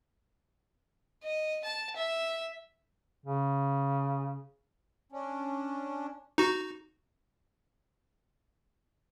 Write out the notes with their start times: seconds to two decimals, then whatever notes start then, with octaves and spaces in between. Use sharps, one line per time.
1.23 D#5
1.65 A5
1.96 E5
3.26 C#3
5.12 C#4 D4
6.38 D#4 F#4